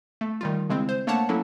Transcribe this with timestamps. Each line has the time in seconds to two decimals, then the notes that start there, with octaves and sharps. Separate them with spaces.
0.21 A3
0.41 D#3 G3 F4
0.70 C#3 G#3 C4 E4
0.89 C5
1.07 A3 A#3 D4 C#5 F#5 A5
1.29 F#3 A#3 C#4 E4 A4